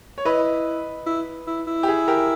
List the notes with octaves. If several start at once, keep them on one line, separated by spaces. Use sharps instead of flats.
C#5
E4 B4 D#5
E4
E4
E4
G4
G#4
G4 A#4